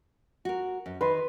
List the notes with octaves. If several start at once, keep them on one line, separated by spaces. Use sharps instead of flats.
F#4 A#4
F#2
D#3 B4 C6